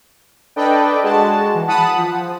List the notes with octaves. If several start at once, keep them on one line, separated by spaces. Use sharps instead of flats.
D4 A4 B4 D5 D#5 G5
G#3 F#4 A5
E3
F#5 A5 B5 D#6
F3